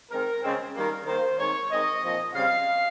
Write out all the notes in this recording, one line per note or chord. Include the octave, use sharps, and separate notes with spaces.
D#3 G#3 C4 A#4
C#3 G#3 C4
D#3 G3 A#3 A#4
D#3 A#3 C5
D#3 G#3 C4 C#5
D#3 G#3 C4 D#5
A#2 F3 C4
C#3 G3 C4 F5